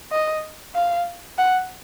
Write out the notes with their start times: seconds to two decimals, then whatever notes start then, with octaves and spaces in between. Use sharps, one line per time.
0.12 D#5
0.75 F5
1.38 F#5